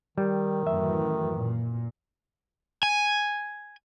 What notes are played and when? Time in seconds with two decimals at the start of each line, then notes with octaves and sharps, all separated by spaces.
0.18 D#3 G3
0.67 F#2 A2 E3 E5
1.34 A#2
2.83 G#5